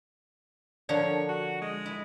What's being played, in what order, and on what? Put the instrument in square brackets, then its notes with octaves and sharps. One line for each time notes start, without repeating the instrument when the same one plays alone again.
[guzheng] D3 F3 A#4 [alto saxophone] C#5
[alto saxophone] F#4
G#3
[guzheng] E4